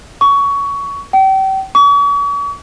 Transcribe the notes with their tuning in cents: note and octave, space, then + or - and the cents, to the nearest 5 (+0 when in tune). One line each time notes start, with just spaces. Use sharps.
C#6 +20
G5 -35
C#6 +45